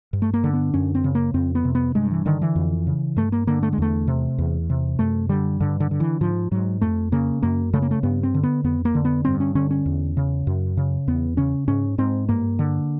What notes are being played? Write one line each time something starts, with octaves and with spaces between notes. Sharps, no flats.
G2
A3
A#3
D3
B3
F#2 C#4
C4
C#3
A#3
F2 C4
B3
C3
B3
G2 G#3
E3
D3 D#3
E3
F2
C#3
G2 A3
A#3
D3 A#3
A3
G#3
E2 A3
C3
E2
C3
F#2 A3
D3 G3
G2 D3
D3
D3
E3
G#2 F3
G#2 F#3
F2 A3
C#3 A#3
F#2 A#3
C#3 A3
A#3
A3
G2 B3
C4
D3
B3
F2 B3
A#3
D3
B3
G2 C4
C#4
D3 C#4
C#4
E2
C#3
F#2
C#3
E2 B3
C#3 C#4
G#2 C#4
G#2 C4
G2 A#3
D3